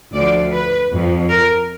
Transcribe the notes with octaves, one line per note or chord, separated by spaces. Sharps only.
D2 D3 F3 D5
B4
F2 F3
A#4